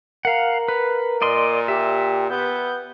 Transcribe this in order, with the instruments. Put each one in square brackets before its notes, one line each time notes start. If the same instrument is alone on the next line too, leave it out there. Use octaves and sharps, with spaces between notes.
[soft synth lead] A#4 [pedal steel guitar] F5 F#5
[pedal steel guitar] B4
[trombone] A#2 [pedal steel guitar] D5 D#5 C6
[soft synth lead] G4 [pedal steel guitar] E5
[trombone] B3 [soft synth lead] G6